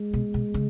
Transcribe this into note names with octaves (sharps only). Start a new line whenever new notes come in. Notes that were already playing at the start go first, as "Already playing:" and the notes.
Already playing: G#3
B2
B2
C#3